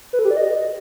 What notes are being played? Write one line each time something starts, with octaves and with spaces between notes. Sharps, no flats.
B4
A4
G4
D5
D#5